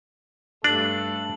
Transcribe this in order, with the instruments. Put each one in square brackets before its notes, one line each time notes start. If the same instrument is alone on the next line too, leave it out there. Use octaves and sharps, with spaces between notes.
[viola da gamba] G2 G3 A3 [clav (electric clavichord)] D4 [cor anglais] A4 [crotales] F#7